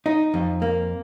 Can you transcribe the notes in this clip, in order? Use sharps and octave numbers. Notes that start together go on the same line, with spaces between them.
D#4
F2
A#3